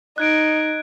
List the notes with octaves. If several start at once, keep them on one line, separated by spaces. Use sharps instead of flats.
D#4 F#6 G#6 D7